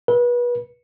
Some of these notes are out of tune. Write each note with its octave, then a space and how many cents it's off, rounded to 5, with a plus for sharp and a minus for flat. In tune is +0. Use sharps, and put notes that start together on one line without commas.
B4 -30